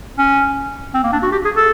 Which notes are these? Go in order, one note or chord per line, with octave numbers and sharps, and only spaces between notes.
C#4
C4
A#3
D4
F#4
G4
G#4
A4